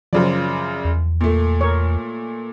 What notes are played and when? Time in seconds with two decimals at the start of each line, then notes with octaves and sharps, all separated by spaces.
0.13 F#2 C#3 F3 F#3 D5
0.85 E2
1.21 A#2 A3
1.61 A#4 C#5